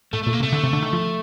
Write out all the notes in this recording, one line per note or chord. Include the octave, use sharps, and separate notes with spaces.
A2 A3
A#2 A3
A#3
C3
A3
D3
C3
D3
D#3
F3